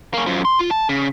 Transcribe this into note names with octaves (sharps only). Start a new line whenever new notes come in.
A#3 C#4
F#2 F3
C6
F4
A5
C#3